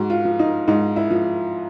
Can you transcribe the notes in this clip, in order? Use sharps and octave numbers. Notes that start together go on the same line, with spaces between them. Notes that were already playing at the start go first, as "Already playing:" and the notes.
Already playing: G#2 F#4
F4
F3
D#4
G#2 D#4
E4
F3